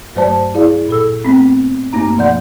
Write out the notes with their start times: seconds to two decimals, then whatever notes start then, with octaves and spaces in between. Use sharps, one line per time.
0.16 G2 F#3 A3 C5 D5 A5
0.54 E4 G#4 D5 F5
0.89 A#2 A4 E6
1.25 A3 B3 C4
1.93 G2 A3 A#3 D#4 A#5
2.18 B2 F3 D5 F#5 G6